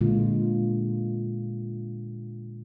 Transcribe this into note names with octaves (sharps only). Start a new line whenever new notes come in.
A#2 D3 G#3 F4